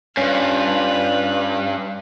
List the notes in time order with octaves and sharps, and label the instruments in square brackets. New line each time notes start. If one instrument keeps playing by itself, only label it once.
[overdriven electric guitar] G2 [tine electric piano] C#4 [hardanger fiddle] F4 B4